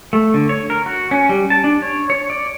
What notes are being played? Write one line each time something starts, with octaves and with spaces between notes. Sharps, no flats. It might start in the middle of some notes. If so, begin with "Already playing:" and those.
A3
D3
C#5
A#4
F#4
C#4
G3
A5
D4
C#5
C#5
D5